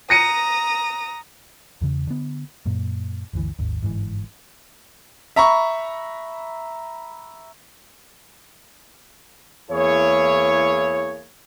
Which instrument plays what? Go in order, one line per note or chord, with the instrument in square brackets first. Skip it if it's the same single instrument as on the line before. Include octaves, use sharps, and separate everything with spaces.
[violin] A#5 D#6 [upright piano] A#6 C#7 D#7
[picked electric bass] E2 C#3
D3 B3
F#2 A#2
G1 D2 E3
G#1 D#2
G1 G#2 B2 E3
[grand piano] E5 A#5 B5 C#6
[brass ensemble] E2 A#3 E4 G#4 C#5